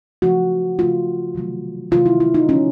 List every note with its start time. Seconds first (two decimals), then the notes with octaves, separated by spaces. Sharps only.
0.22 C#3 F3 A3 F#4
0.79 C#3 F3 A3 F4
1.35 C3 D#3 F#3 A3
1.91 C3 D#3 F#3 A3 F4
2.06 E4
2.20 E4
2.34 D#4
2.48 D3 F3 G#3 C#4